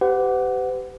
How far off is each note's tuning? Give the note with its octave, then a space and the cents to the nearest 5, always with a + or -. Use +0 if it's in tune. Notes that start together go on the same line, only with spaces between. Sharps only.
G4 -15 B4 +45 F#5 +0